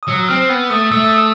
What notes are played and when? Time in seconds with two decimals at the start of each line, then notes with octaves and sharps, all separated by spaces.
0.03 D#6
0.08 F#3 E6
0.28 C4 F6
0.49 B3 E6
0.70 A3 D#6
0.92 A3 E6
1.05 D#6
1.18 E6